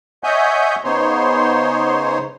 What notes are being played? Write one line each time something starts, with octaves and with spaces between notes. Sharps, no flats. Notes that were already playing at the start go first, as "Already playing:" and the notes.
C#5 D#5 E5 F#5 G#5 G6
C#3 B3 D#4 C5 C#5 C6